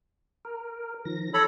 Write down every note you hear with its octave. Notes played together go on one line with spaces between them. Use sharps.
A#4
D#3 F3 A#6
A4 C#5 B5 A#6